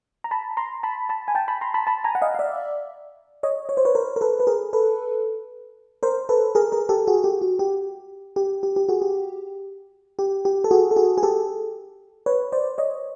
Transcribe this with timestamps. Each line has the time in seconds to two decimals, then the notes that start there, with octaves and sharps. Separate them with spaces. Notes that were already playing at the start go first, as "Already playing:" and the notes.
0.24 A#5
0.31 A5 B5
0.57 A#5 C6
0.83 A5 B5
1.09 A5 B5
1.28 G#5
1.35 G5 A5
1.48 A5 B5
1.61 A#5 C6
1.74 A5 B5
1.87 A5 B5
2.04 G#5 A#5
2.15 F#5
2.22 D#5 F5
2.35 F5
2.39 D5 E5
3.43 C#5 D#5
3.69 C#5
3.77 C5
3.85 B4 C#5
3.95 A#4 C5
4.16 A#4
4.21 A4 B4
4.40 B4
4.47 G#4 A#4
4.73 A4 B4
6.03 A#4 C5
6.29 A4 B4
6.55 G#4 A#4
6.72 G#4 A#4
6.89 G4 A4
7.07 F#4 G#4
7.24 G4
7.41 F#4
7.59 G4
8.36 G4
8.63 G4
8.76 G4
8.89 F#4 G#4
9.02 G4
10.19 G4
10.45 G4
10.64 A4
10.71 F#4 G#4
10.91 A4
10.96 F#4 G#4
11.18 G#4
11.23 G4 A4
12.26 B4 C#5
12.52 C5 D5
12.78 C#5 D#5